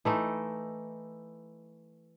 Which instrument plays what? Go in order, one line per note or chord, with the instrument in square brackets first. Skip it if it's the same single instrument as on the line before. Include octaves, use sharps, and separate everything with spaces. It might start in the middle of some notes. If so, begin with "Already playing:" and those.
[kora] E3 A3 D#4